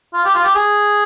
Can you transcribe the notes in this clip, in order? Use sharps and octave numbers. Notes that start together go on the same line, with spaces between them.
F4
G4
F4
G4
G#4